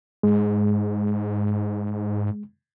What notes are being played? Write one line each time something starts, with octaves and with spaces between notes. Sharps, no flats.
G#2 G#3